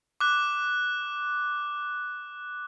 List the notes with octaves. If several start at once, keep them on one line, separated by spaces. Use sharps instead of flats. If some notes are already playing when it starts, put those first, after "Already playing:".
D6 F#6